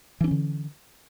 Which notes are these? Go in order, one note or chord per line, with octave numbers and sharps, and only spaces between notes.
D3 E3 C#4 D4